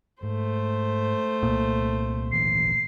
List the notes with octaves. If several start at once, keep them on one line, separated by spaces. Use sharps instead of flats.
G#2 A3 C5
C2 A#2
G#1 D2 E3 C7